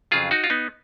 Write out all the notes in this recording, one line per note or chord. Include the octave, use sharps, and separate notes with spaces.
F2 C#3 F#3 F4 G#4
D#4 F#4
F4
B3 D#4